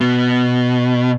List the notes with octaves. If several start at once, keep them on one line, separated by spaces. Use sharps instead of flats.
B2